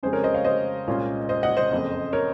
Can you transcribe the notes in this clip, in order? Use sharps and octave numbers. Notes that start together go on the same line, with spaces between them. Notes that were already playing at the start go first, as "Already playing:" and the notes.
F2 C#3 G#3 C#4 G#4 C5
A#4 C#5
C5 D#5
C#5 F5
C5 D#5
C2 A#2 G#3 C#4 F4
C5 D#5
D#5 F#5
C5 D#5
F#1 F2 C#3
A#4 C#5